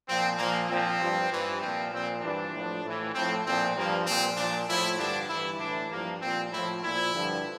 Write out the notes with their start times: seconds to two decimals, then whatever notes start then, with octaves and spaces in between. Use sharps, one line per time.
0.08 A#2 F3 C4
0.39 A#2 F3 A#3
0.69 A#2 F3 C4
1.01 G2 F3
1.31 G2 E3
1.61 A#2 F3 C4
1.92 A#2 F3 C4
2.22 G2 E3 D4
2.53 A2 F3
2.84 A2 E3
3.14 A2 F3 C4
3.45 A#2 F3 C4
3.76 G2 F3 A#3
4.06 A#2 F3 C4
4.37 A#2 F3 D4
4.68 A2 F3 E4
4.98 G2 D3 F3 D4
5.29 G2 E3 E4
5.60 A2 E3 D4
5.91 G2 F3 A#3
6.21 A#2 F3 C4
6.52 A2 F3 E4
6.83 A#2 F3 E4
7.14 G2 D3 F3